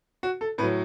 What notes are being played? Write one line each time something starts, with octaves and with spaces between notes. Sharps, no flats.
F#4
A4
A2 F#3 B4